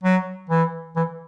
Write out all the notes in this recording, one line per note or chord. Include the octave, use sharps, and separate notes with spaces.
F#3
E3
E3